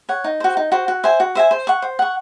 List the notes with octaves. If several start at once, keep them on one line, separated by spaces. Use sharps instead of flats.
C#5 F#5
D#4
F#4 C5
D#4
F#4 C5
F#4
C5 E5 G#5
F#4
C5 E5 G#5
C5
F#5 C#6
C5
F#5 C#6